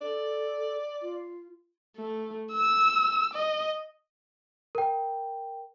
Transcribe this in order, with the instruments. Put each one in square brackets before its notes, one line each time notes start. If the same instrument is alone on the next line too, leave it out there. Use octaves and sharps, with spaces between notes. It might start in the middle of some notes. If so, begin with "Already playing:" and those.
[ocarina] A4 [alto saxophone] D5
[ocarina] F4
[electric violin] A3
E6
D#5
[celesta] A#4 G5